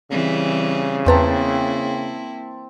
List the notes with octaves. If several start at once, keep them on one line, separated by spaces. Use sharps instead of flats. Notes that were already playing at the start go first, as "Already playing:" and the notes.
C#3 E3 G3 C4
E2 A#3 C4 E4 B4 G5 A5 A#5